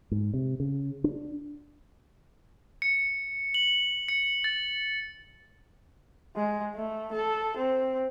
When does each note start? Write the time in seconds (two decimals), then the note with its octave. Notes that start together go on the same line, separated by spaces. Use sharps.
0.11 G#2
0.34 C3
0.60 C#3
1.04 D4
2.82 C#7
3.54 F#7
4.08 C#7
4.44 A6
6.36 G#3
6.75 A3
7.13 A4
7.57 C4